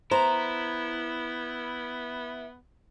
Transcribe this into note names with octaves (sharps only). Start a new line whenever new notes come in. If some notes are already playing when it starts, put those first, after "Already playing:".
B3 E4 C5 A#5